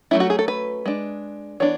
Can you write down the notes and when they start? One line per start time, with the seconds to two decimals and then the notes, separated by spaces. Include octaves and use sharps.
0.11 F#3 A3 C#4 E4
0.20 F#4
0.30 G#4
0.39 A4
0.48 B4
0.86 G#3 D4
1.60 E3 B3 D4 C#5